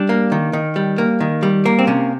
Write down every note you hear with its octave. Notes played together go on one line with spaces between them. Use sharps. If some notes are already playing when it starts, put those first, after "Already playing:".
Already playing: G3 D4
A#3
D#3
D#3
G3
A#3
D#3
G3
A#3
C4
C3 C#4